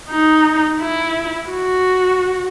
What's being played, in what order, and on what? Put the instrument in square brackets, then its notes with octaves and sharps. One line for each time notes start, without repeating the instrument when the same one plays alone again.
[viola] D#4
E4
F#4